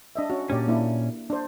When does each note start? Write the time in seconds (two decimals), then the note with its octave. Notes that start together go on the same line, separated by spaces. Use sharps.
0.16 D4 D#5 E5
0.30 C#4 F#4
0.50 A#2 C#4 D4 G4 D5
0.68 A#3 D4 E4
1.30 D4 C5